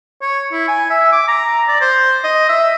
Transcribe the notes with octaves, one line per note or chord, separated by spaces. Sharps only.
C#5
E4
G#5
E5
D6
A#5
D5
C5
D#5
E5